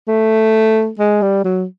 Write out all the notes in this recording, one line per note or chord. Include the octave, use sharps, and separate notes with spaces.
A3
G#3
G3
F#3